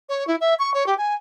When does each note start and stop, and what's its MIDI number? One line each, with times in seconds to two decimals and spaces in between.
0.09 0.26 73
0.27 0.35 64
0.40 0.54 76
0.59 0.73 85
0.74 0.86 73
0.86 0.94 67
0.98 1.14 80